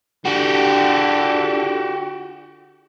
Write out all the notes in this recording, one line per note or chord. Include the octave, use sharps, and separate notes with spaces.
D3 F#4 G4